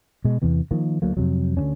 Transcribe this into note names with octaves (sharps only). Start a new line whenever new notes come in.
B2 G#3
E2 C3 E3 B3
D#3 F3 A#3
D2 F#3 A#3
F2 C3 F#3
D2 D3 D#3 C#4